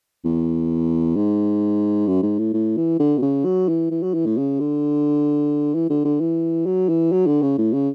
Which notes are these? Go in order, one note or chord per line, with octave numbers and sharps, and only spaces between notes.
E2
G#2
F#2
G#2
A2
A2
E3
D3
B2
C#3
F#3
E3
E3
F#3
E3
A2
C#3
D3
E3
D3
D3
E3
F#3
E3
F#3
D3
C#3
A2
C#3